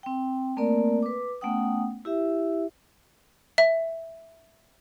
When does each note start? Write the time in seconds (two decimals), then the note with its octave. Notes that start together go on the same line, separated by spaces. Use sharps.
0.03 C4 G5
0.57 A3 A#3 C4 A#4 D5
1.02 B4 D6
1.41 A3 B3 C#4 F#5 G5 D#6
2.05 E4 G4 E5
3.58 E5